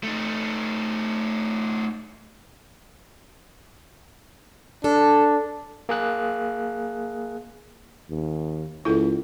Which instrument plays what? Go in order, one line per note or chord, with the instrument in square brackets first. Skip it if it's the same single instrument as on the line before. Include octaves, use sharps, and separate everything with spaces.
[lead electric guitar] A3 D#4
[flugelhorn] D4 [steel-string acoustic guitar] A4
[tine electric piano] A#3 G#4 F#6
[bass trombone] D#2
[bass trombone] C#2 [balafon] E4 F4 A4